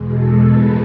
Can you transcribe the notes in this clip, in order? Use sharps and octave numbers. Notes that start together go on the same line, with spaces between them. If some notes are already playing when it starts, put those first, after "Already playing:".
Already playing: E2 B2 G#3
A4
A2 F3 G#3 B4